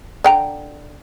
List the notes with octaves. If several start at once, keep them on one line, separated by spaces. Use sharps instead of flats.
D3 G5 A#5